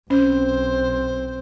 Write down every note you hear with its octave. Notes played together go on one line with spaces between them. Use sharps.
B1 C4 C#4 C5